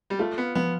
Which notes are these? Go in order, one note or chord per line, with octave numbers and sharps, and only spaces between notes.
G3
A3 F4
B3
F3 B3